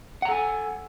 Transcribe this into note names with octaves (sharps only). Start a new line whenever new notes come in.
A4 F#5 G#5 A#5